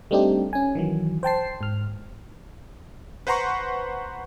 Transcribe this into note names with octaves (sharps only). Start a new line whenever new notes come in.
G3 A3 C4 D4 D#4 G4
C#4 G#5
D#3 E3 F#3
C5 G5 A5 C7
G#2 F6
B4 C5 F#5 A#5 C6 C#6